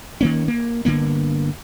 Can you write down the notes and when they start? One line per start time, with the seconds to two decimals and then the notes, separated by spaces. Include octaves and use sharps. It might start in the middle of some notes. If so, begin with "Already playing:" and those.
0.21 D#3 A#3 C#4
0.48 A#3
0.85 G1 D3 A#3 B3